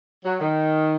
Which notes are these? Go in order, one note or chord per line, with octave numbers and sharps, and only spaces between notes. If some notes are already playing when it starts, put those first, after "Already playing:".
F#3
D#3